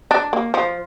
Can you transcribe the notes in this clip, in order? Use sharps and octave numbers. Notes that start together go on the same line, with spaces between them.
D4
A#3
F3